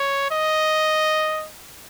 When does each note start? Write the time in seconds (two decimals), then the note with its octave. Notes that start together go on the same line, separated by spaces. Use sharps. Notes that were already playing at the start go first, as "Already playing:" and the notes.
Already playing: C#5
0.31 D#5